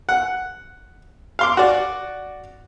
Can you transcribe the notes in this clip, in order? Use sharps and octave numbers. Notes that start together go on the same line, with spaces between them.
F#5
F5 C6 D6
F#4 D5